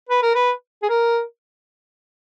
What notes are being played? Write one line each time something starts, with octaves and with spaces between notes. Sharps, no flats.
B4
A#4
B4
G#4
A#4